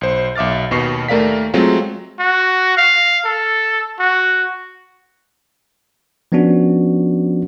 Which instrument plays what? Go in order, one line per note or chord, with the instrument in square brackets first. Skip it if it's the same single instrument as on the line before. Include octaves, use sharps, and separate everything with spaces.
[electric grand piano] B1 C5
B1 E5 D6 F6 A6
D#2 B2 C#6 C7
D#2 A3 A#4 D5 F5 B6
F#3 G#3 A3 C4 F4
[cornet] F#4
F5
A4
F#4
[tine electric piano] F3 B3 C#4 D4 F#4